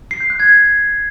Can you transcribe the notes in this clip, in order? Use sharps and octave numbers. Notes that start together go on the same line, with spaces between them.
C7
G6
F#6
G#6